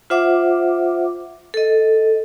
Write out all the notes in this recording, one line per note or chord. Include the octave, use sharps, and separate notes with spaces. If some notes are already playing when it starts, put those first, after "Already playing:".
F4 C5 E5 F#5 D6
A4 D#5